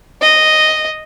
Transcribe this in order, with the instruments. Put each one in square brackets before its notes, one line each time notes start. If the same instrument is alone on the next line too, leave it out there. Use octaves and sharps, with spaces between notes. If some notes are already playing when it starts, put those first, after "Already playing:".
[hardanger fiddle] D#5